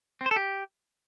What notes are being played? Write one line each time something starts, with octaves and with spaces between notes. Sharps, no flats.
C4
C5
A4
G4